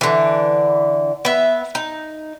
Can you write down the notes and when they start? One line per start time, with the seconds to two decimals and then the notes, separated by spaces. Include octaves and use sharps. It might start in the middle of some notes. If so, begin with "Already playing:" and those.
0.01 D3 E3
1.25 B3 E5
1.75 D#4